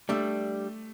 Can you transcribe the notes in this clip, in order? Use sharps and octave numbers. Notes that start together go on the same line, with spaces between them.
G3 A3 D4 E6